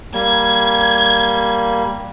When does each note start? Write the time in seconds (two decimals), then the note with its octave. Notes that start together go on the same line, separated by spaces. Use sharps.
0.14 G3 A#3 G#6